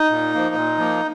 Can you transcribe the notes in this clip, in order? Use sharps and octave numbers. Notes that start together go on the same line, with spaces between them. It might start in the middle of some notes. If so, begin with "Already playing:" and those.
Already playing: D#4
A#2
F3 A#3
A#2
F3 A#3